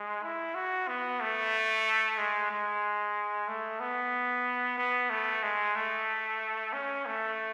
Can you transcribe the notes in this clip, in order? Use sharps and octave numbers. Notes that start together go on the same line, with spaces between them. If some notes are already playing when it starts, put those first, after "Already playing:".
Already playing: G#3
E4
F#4
B3
A3
G#3
G#3
A3
B3
B3
A3
G#3
A3
C#4
A3